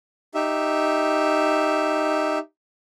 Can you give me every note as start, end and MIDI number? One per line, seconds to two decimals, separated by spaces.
0.35 2.38 63
0.35 2.38 67
0.35 2.38 76